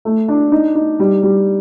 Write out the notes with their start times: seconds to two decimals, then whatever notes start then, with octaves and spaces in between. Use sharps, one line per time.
0.05 A3
0.28 D4
0.52 D#4
0.75 D#4
1.00 G3
1.23 G3